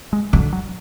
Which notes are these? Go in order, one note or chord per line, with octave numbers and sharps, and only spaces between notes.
G#3
D3 F#3
F#3